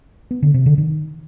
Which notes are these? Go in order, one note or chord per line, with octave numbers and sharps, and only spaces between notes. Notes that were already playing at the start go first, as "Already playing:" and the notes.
B3
D3
C3
D3
D#3